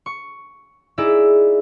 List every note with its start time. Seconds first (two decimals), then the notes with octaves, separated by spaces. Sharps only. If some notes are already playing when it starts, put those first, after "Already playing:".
0.06 C#6
0.98 D#4 E4 G#4 D5 E5